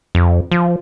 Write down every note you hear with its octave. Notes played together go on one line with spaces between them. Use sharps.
F2
F3